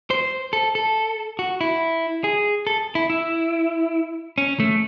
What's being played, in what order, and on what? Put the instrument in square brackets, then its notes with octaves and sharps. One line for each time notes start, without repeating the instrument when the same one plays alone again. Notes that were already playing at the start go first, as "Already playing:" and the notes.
[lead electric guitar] C5
A4
A4
F#4
E4
G#4
A4
E4
E4
C#4
A3